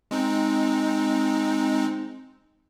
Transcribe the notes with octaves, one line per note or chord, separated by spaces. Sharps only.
G#3 C4 D#4